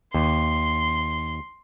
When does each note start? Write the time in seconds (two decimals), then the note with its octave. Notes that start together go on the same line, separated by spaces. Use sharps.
0.14 D#2 C6